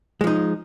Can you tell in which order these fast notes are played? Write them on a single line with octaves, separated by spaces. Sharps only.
G#3 F3 D#4